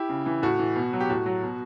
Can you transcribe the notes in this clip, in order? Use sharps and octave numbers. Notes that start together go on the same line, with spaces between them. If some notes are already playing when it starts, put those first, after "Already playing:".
Already playing: E4 G4
C#3
E3
A2 F#4
E3
B2
F#3
G4
A2 F#4
F#3
B2